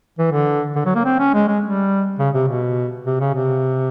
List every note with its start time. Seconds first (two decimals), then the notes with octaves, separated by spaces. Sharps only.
0.19 E3
0.32 D3
0.76 D3
0.86 F#3
0.96 A#3
1.05 C4
1.19 C#4
1.34 G#3
1.48 G#3
1.63 G3
2.19 C#3
2.34 C3
2.48 B2
3.07 C3
3.21 C#3
3.34 C3